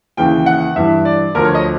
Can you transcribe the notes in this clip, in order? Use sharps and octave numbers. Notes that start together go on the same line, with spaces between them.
D#2 C#3 E3 G5
F#5
G2 E3 E5
D5
D2 D3 F3 A#4
C#5
D#5